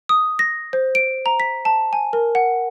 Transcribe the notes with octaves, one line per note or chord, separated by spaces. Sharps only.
D#6
A#6
C5
D7
A#5
B6
A5
G#5
A#4
F#5